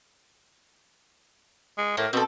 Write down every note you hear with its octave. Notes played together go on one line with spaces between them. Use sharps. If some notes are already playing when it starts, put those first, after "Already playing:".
G#3
A2 A#3
B2 C4 A4